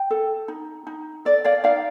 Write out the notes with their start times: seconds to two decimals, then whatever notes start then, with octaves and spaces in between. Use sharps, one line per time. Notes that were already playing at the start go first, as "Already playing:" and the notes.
Already playing: G5
0.10 A4
0.48 D#4
0.87 D#4
1.25 A4 D5
1.44 D5 F5
1.64 D#4 D5 F5